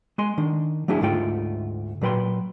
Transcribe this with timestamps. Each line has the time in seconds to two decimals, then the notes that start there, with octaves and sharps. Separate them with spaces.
0.18 G#3 G#5 C6
0.38 D#3 D4
0.88 F#3 A3 D4 E4 G#4
1.01 D2 G#2 A3 F4 G5
2.01 A#2 F#3 B4 G5 C6